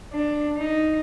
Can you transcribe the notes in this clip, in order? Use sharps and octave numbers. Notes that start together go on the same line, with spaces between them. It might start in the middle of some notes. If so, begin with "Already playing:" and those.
D4
D#4